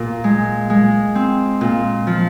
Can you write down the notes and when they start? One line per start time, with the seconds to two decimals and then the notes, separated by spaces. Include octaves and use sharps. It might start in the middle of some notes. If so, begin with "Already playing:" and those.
Already playing: A#2 A#4
0.24 G#3
0.70 G#3
1.15 C4
1.61 A#2
2.07 F3